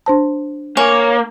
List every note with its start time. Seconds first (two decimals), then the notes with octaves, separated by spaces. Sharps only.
0.06 D4 C5 A5
0.77 A#3 C#5 G#5